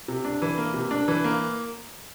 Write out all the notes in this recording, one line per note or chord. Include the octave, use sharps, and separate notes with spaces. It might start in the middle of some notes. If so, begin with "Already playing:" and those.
C3
D4
E3
A#3
C3
D4
E3
A#3